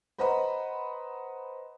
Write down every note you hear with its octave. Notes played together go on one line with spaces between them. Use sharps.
B4 C5 D#5 F#5 A#5 B5